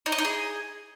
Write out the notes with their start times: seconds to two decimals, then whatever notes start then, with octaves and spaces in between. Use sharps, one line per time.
0.06 D#4
0.12 D#5
0.18 D#4
0.25 G#4